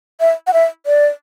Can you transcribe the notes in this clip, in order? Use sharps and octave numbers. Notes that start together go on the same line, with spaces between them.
E5
F#5
E5
D5